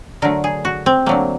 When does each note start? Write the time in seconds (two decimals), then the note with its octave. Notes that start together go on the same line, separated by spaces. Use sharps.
0.22 D3 F#3 A3 A#4
0.44 G#4
0.65 F#4
0.86 C4
1.06 D3 F#3 A3 A#3